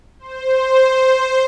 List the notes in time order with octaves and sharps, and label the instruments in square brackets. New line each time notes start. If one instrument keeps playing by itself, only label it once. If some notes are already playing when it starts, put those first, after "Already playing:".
[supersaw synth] C5